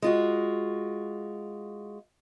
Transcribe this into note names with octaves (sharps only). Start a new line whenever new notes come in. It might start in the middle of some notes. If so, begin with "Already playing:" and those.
G#3 F4 F#4